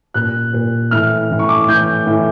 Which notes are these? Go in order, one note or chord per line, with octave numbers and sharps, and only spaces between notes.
A#2 F#6
A#2
A2 E3 F6
A2 E3
C#6
D6
A2 E3 G6
A2 E3